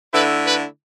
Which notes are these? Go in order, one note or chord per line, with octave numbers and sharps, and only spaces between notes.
D3 A3 E4 B4
B4